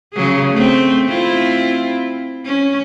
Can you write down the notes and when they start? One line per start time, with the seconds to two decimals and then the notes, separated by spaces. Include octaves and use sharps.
0.14 C#3 F#3 G#4
0.52 A3 C4
1.08 C4 E4 F4
2.45 C#4